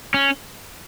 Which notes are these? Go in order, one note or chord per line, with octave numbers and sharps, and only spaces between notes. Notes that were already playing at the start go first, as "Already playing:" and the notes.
C#4